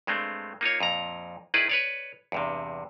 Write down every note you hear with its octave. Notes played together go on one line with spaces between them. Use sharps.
G2 G#3 A3 C4
A#3 D#4 F4 C#5
F2 A#2 A#5
D#3 D#4 E4 G#4 B4 D5
B4 C#5 D5
E2 G2 C3